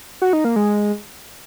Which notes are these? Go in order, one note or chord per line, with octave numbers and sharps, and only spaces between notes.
F#4
D#4
A#3
G#3